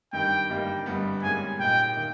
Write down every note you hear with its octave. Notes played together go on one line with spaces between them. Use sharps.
G2 D#3 G3 G5
G1 G2 G3 A#3 D#4
G1 G2 G3 B3
G#2 G3 A#3 C#4 G#4 G#5
A#2 A#3 D#4 G5
D#3 A#3